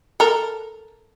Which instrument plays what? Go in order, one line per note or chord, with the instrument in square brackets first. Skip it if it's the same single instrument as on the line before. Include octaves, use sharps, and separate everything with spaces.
[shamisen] A4 A#4